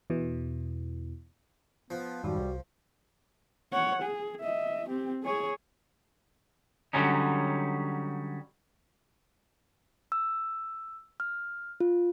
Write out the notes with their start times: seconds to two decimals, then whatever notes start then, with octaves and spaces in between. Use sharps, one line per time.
0.10 E2 B2 E3
1.91 F3 B3
2.24 F2 G#2 D#3 G3 F#4
2.38 C2
3.72 C#5 F#5
4.02 G#4
4.41 D#5 E5
4.88 C4 G4
5.23 G#4 C#5
6.93 D3 F#3 G3 C#4 D#4
10.12 E6
11.20 F6
11.80 F4